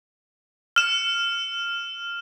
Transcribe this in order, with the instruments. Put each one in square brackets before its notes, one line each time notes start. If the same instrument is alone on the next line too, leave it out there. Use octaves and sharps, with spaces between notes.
[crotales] F6 E7